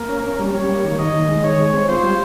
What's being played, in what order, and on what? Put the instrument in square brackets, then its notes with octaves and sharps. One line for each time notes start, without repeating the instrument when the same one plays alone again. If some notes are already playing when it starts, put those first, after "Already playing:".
Already playing: [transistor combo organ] A#3 [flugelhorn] A#4
[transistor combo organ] C#4
C#4
G3
[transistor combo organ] G3 [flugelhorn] C#5
[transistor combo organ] A#3
D#3
[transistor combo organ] D#3 [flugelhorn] D#5
[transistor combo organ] D#3
G#3
[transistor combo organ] D#3 [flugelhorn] C#5
[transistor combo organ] G#3
C4
[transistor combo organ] F4 [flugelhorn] C5
[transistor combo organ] G3